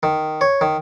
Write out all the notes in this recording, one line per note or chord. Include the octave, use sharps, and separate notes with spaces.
D#3
C#5
D#3